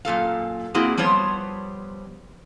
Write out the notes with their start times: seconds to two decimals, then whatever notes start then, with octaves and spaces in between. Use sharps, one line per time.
0.05 F#2 A#2 A4 F5
0.74 A#3 C4 E4 F#4 G#4
0.97 F3 G3 B3 C5 C#5